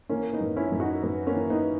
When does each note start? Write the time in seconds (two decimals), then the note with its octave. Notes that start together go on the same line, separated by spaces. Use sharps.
0.09 E3 A#3 C#4
0.33 B3 D#4
0.41 F#2
0.56 C#4 E4
0.72 F#2
0.80 D#4 F#4
1.03 F#2 B3
1.26 A#3 C#4
1.34 E3
1.50 B3 D#4